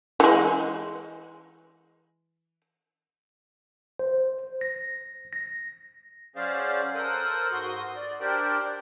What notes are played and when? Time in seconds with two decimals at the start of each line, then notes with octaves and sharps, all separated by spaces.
0.20 E3 G#3
3.99 C5
4.61 A#6
5.33 A#6
6.36 F#3 C#4 G#4 C5 D5 F5
6.95 A4 A#4 C5 D#6 F#6
7.52 G#2 F#4 C6 D#6
7.96 D5
8.20 D4 G4 A#4 C5 D5 G5